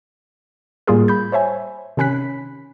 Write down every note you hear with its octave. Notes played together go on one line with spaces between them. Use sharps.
A2 G3 A#3 F4 G#4 A#4
B5 G6
C5 C#5 E5 G#5
C3 D#3 C#4 B5 F#6 B6